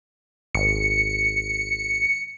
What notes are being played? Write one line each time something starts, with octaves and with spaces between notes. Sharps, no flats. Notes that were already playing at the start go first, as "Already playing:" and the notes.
G#1 C#7